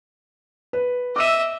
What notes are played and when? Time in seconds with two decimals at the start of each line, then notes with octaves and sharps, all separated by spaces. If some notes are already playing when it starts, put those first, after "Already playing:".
0.73 B4
1.16 D#5 E5 D6 E6 D#7